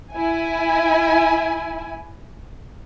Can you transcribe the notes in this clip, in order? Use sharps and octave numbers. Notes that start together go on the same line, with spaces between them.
E4 G#5